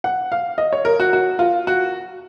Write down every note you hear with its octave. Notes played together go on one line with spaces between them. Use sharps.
F#5
F5
D#5
C#5
A#4
F#4
F#4
F4
F#4